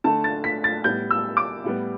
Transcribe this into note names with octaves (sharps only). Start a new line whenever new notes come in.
D3 A3 A5
A6
B6
A6
A2 G3 B3 G6
E6
D6
A2 G3 B3